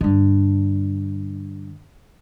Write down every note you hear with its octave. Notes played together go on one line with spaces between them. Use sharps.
G2 D3